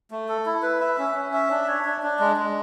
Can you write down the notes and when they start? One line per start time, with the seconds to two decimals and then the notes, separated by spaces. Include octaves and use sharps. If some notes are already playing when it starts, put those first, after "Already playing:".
0.11 A3
0.29 A4
0.46 E4
0.63 B4
0.80 E5
0.98 C#4
1.15 C#4
1.33 E5
1.50 D4
1.68 C#5
1.85 D4
2.02 D4
2.19 G#3
2.37 G#3